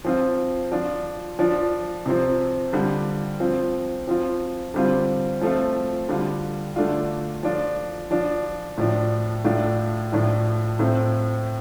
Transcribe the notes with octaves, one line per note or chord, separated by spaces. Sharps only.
F3 C4 F4
F3 D4 F4
F3 D4 F4
C3 F3 C4
D3 G3 F4
F3 C4 F4
F3 C4 F4
D3 G3 C4 F4
F3 A3 C4 F4
D3 G3 F4
D3 A3 D4 F4
F3 D4 F4
F3 D4 F4
A2 F3 D4
A2 A3 D4 F4
A2 F3 D4 F4
A2 A3 C4 F4